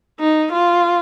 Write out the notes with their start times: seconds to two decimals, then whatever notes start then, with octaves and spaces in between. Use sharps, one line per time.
0.20 D#4
0.53 F4